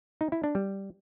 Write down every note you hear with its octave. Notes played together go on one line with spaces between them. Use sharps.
D#4
E4
D4
G3